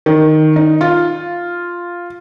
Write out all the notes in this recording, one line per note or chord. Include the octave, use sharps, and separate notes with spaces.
D#3
D#4
F4